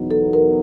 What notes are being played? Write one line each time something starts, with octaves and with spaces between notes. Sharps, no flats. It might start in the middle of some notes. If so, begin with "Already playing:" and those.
Already playing: E2 B2 F#3 B3 D#4
A4
A#4